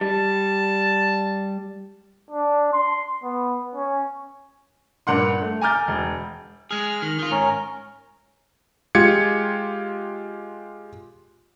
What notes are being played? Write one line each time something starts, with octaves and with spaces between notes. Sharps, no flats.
G3 A5
D4
C6
B3
C#4
G2 A#2 F#5 C6
A3
G#5 A#5 D6 F6 G6 A6
E1
G#3 G#4 F6
D#3
D#3 F4
G#2 C#4 A#4
G#3 F4 G4 G#6 C#7